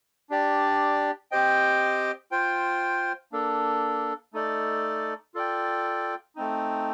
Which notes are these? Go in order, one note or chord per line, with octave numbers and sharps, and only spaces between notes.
D4 G4 D5
C4 G4 C5 D#5 G5
F4 C5 G5
A#3 D4 A4
A3 D#4 A4 D5
F4 A4 D5 G5
A3 C4 D#4